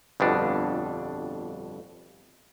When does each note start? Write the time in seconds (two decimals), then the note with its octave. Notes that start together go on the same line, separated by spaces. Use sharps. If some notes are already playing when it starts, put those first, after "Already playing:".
0.20 G1 F2 B2 D4